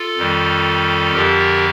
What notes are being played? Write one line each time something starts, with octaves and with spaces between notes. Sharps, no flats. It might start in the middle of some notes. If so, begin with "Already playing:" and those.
Already playing: F4 A4
F2 D#3 G3
F2 D3 F3 G4 A#4